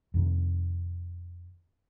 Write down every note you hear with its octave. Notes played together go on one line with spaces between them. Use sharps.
F2 C3 D#3